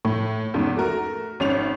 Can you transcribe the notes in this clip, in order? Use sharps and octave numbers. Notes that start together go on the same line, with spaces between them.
A2
E2 G#2 C#3
A3 F#4 A#4
G#1 C#4 F7